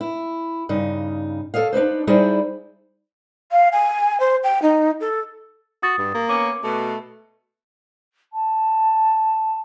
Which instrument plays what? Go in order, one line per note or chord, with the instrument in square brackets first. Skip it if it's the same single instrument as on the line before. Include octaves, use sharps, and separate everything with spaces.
[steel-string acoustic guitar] E4
G2 C#3 D#4
A4 C5 C#5 D#5 F5
D4 D#4 B4 C5
G3 D#4 E4 G#4 C5 D5
[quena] F5
G#5
C5
G5
D#4
A4
[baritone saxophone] F#4 [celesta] D#6 A6
[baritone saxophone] G2
A#3
[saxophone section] B3 C#4 [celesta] D6
[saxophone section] B2 [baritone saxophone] A3
[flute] A5